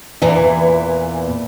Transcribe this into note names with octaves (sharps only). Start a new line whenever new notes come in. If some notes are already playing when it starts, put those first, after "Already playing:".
E2 A#2 E3